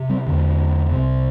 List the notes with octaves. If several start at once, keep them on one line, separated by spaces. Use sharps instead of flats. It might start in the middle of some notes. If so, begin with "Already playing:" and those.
Already playing: C3
G3 C4
E2 D3
C2 C3